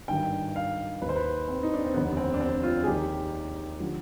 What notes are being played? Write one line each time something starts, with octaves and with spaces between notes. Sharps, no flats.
G#1 G2 D#3 G5
F5
D#2 D#3 B4
C5
B4
C4
D#4
D4
C4
F1 D#2 D3 B3
C4
D4
C4
F4
G#4
D#2 D#3 G4
D3 F3